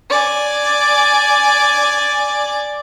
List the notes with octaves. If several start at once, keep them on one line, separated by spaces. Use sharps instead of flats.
D5 G#5